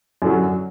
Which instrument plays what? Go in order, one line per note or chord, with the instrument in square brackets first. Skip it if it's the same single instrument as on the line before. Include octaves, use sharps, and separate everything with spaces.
[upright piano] F#2 D3 F#3